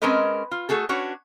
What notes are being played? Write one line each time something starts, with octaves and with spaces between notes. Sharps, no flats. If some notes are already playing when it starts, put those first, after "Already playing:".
G#3 C4 C#4 A#4 B4 D#5
F4
A3 F#4 G#4 A4
C#4 D4 F#4 B4 C#5